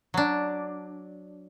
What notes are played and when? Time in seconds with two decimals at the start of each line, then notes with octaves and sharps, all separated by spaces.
0.14 F#3 D4